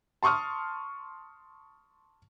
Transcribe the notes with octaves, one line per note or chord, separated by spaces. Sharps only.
A5 C6 C#6 D#6 F6